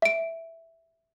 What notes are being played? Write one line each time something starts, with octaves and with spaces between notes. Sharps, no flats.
E5 D7